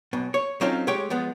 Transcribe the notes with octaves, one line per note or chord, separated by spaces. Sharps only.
B1 B2
C#5
F#3 C4 C#4 D#4 F4 A4
G#3 A3 G4 C#5 G5
F3 G#3 B3